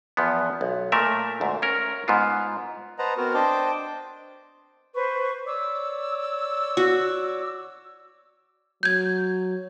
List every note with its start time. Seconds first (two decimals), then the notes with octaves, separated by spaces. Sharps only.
0.17 E2 F3 B3
0.61 B1
0.92 A#2 A3 A#4 E5
1.41 D2 G#2
1.62 C#4 A#4
2.08 G#2 B3 F4
2.99 B4 C5 D#5 F#5 A5 A#5
3.17 B3 C4 F#4 A#4
3.34 D4 C5 D#5 G5 A5 D6
4.94 B4 C5 C#6
5.47 C#5 D5 D6 E6
6.77 F#4
8.83 F#3 G6 G#6